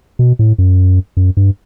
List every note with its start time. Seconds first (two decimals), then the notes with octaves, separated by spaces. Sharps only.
0.19 B2
0.39 A2
0.58 F#2
1.17 F#2
1.37 G2